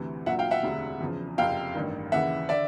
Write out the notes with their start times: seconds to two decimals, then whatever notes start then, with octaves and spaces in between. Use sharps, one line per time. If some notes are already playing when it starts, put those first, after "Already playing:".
Already playing: D2 C3 E3
0.26 A#1 A#2 F#3 E5 F#5
0.39 F5 G5
0.51 E5 F#5
0.63 E1 D2 C3
1.01 E2 C#3 F3
1.38 F#1 F2 C3 F5 G5
1.74 A1 G2 D#3
2.12 D#2 C#3 E3 E5 F#5
2.49 D3 D5 E5